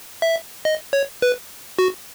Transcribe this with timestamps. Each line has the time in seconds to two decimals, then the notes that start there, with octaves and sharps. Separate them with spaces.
0.22 E5
0.65 D#5
0.93 C#5
1.22 B4
1.79 F#4